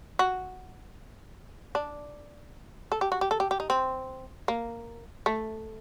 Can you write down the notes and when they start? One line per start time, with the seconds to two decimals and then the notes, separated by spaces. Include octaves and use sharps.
0.19 F#4
1.75 D4
2.92 A4
3.01 G4
3.12 F#4
3.21 G4
3.31 A4
3.40 G4
3.51 G4
3.60 D#4
3.70 C4
4.48 A#3
5.26 A3